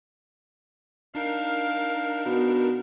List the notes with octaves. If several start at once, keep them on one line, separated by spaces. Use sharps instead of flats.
D4 D#4 A#4 F5
B2